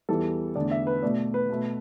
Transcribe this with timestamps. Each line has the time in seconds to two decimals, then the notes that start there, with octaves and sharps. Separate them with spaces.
0.09 E2 E3 G3 A4
0.55 E2 D3 A3 D5
0.71 E5
0.87 B4
1.03 B2 A3 D5
1.34 B4
1.49 B2 A3